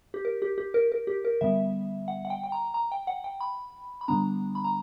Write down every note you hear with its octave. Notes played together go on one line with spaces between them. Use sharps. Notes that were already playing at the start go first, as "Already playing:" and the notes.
G4
A#4
G4
G4
A#4
A#4
G4
A#4
D3 G3 B3 E5
F#5
F#5
G5
G5
A#5
A#5
G5
F#5
G5
B5
B5
D3 G3 B3 D4 A#5
B5
A#5